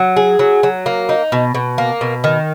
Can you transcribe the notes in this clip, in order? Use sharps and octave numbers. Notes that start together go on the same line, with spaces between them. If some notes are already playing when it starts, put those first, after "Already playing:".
Already playing: F#3
G#4
F#3
F#3
A#3
D#4
B2
B2
A#3
B2
D#3